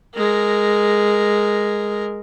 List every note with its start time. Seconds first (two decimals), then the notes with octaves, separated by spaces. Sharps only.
0.15 G#3 A#4